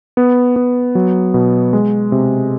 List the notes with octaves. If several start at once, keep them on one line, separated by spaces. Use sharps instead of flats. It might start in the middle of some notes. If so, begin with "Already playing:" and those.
B3
B3
F#3
B2
G#3
C3